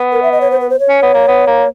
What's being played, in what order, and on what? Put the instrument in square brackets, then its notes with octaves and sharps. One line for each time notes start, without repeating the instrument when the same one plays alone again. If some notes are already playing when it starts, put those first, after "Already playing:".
Already playing: [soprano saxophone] B3
[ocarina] A#4
E5
D#5
C#5
C5
B4
C5
C#5
[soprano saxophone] C#4
B3
A#3
B3
A#3